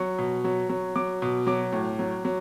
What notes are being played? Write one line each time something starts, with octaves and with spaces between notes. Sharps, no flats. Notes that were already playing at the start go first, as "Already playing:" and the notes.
Already playing: F#3 C#6
B2
F#3
F#3
F#3 D6
B2
F#3 D6
A2
F#3
F#3